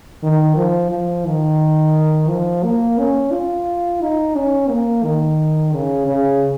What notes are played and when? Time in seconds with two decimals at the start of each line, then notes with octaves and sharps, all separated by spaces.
0.23 D#3
0.56 F3
0.91 F3
1.26 D#3
2.29 F3
2.63 A#3
2.98 C#4
3.31 F4
4.01 D#4
4.35 C#4
4.69 A#3
5.04 D#3
5.73 C#3
6.07 C#3